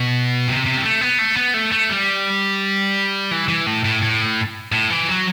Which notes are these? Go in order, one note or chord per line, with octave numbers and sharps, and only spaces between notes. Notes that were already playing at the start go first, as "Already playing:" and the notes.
Already playing: B2
C3
C3
G3
A3
B3
A3
B3
A3
A3
G3
E3
E3
A2
A2
A2
A2
E3
F#3